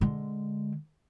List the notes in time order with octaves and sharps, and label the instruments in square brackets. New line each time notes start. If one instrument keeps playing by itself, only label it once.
[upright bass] D3 G#3